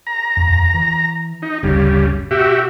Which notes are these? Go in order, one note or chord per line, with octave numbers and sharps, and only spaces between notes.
A#5
D#1 F2
E3
D#4
G1 D2 C#3 G3
B2 F#4 G4 E5